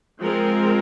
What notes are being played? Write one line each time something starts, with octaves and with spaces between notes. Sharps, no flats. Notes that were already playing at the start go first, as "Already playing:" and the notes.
F3 G#3 C4 A#4